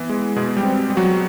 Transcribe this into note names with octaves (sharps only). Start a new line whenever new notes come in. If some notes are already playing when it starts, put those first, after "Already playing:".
Already playing: E3 B3
G#3
B2 G#3 G#4
G3 G4
C4
G3
F#3 F#4